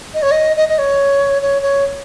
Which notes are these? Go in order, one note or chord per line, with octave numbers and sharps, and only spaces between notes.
D#5
C#5
D#5
D#5
D#5
C#5
C#5
C#5